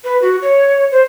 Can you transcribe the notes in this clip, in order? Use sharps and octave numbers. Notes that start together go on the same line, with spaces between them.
B4
F#4
C#5
C5